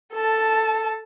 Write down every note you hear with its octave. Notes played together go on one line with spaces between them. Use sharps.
A4 A5